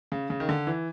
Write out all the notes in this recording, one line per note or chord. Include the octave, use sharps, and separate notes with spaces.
C#3
C#3
D#3
D3
E3